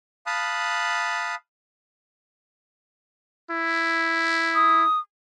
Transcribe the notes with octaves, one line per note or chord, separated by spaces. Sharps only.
F5 A5 B5 D#6 F#6
E4
D#6